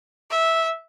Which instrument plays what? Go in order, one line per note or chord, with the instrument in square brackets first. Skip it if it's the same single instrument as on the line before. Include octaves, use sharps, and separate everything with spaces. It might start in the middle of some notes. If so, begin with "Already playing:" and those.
[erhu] E5